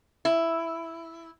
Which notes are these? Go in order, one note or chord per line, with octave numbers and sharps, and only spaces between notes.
E4